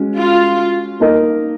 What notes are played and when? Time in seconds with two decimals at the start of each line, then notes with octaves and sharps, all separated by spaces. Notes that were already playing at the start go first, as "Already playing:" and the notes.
Already playing: G#3 C#4 F#4
0.16 F4
1.00 A#3 D#4 A#4 D#5